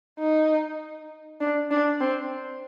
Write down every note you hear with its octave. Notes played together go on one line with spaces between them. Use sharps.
D#4
D4
D4
C4